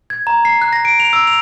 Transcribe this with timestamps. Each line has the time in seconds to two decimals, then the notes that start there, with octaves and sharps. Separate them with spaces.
0.10 G#6
0.27 A#5
0.45 C7
0.61 F#6
0.73 A#6
0.85 D7
1.00 F7
1.13 E6
1.27 F7